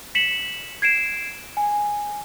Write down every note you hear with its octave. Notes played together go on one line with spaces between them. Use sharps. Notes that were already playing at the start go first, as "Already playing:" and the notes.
B6 C#7 E7 F#7
G#6 C7 D7 E7
G#5